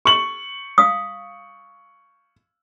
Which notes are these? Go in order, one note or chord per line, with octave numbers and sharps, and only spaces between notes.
C#6 F#7
F5 D#6